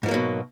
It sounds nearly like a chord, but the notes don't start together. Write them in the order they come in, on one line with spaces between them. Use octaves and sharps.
G#2 F3 A#3 F#3 B2